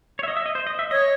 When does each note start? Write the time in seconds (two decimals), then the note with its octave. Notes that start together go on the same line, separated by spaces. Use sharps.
0.19 C#5
0.23 E5
0.28 D#5
0.37 E5
0.46 D#5
0.55 C5
0.67 D#5
0.79 E5
0.91 C#5 D#5